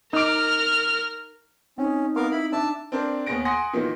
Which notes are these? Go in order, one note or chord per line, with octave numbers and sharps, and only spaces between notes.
D#4 A#4 D6 F6
C4 C#4 D#4
B3 A#4 F5 D6
E4 B5
D4 E5 A5 E6
C4 D4 A#4 C5 D5
D#2 B3 G#4 A#6 D7
F#5 G#5 C6 D#6 A#6
A#2 D#3 E3 A#3